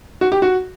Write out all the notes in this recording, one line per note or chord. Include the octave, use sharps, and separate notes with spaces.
F#4
G4
F#4